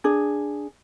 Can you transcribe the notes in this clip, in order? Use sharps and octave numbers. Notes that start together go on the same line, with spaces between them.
D4 G#4